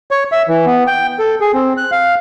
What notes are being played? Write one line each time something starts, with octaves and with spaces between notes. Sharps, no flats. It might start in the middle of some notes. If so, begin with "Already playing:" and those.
C#5
E5
E3
B3
G5
A4
G#4
C4
F#6
F5